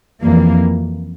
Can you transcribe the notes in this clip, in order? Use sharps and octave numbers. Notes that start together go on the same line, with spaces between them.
F2 E3 G3 A#3